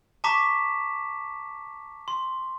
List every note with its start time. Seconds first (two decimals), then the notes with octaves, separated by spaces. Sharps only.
0.24 A5 A#5 C#6 D6 B6 E7
2.08 C6